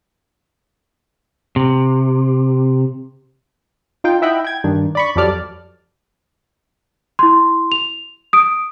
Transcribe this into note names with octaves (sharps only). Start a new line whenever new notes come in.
C3
D#4 F4 G5
E4 D#5 E5 F#5 G5 B5
G5 G#6
G2 D#3 D4
D5 B5 C#6
F2 F#3 G3 A4 D5 F6
E4 C6
F7
D#6 D7